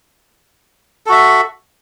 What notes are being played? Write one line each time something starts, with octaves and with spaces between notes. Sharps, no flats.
F#4 A4 E5